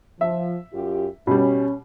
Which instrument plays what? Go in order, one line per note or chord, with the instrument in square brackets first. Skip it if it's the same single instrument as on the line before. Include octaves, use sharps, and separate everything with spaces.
[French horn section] F3 [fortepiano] E5
[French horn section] F#2 F4 G4
[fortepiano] B2 G3 [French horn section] C#4